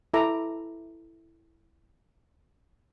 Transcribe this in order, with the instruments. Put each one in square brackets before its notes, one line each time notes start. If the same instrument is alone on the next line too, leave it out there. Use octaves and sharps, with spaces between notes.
[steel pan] E4 A4 E5 A#5 D6